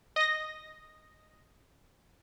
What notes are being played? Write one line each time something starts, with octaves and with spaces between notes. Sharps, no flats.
D#5 A#6